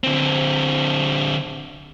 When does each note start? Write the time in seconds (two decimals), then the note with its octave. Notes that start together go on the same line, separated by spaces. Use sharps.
0.04 D3 C4